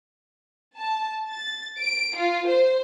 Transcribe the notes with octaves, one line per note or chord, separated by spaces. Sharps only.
A5
A6
D7
F4
C5